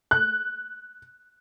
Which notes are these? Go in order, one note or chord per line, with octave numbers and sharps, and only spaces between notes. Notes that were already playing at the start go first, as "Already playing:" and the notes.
F#6